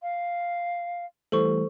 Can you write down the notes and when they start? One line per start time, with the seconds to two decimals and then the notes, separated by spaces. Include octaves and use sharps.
0.02 F5
1.32 E3 G3 A3 A4 C5 C#6